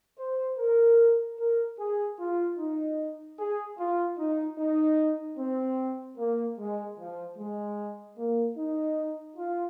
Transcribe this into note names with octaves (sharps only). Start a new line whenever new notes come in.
C5
A#4
A#4
G#4
F4
D#4
G#4
F4
D#4
D#4
C4
A#3
G#3
F3
G#3
A#3
D#4
F4